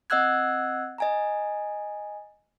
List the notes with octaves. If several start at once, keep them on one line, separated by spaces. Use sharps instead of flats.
C4 D#5 F#5 E6 F#6 G#6
D#5 G#5 A#5